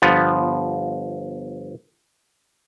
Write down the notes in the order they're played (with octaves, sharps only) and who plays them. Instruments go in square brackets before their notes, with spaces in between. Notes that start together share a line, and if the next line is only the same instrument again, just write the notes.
[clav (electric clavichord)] G1 F3 B3